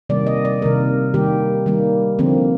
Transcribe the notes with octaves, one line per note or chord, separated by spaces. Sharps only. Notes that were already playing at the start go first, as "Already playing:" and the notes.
C3 D#3 G3 A#3 D5
D#5
D5
C3 D#3 G3 A#3 A#4
D#3 G3 A#3 G4
D#3 G3 A#3
D3 F3 A#3 C4